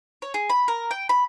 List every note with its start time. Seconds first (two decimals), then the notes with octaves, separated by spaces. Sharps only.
0.22 C#5
0.34 G#4
0.50 B5
0.68 A#4
0.91 G5
1.09 B5